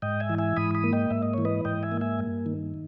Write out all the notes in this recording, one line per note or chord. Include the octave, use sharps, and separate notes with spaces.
G#2 D#5 G5
E5 G#5
E3
E5 G#5
G#2 B5 D#6
B5 D#6
A#3
D#5 G5
G#2 E5
D#5
E3 C#5
B4 D#5
G#2 D#5 G5
E5 G#5
A#3
E5 G#5
G2
D#3